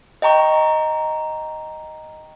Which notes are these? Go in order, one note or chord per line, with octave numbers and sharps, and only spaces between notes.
D#5 G5 A#5 C#6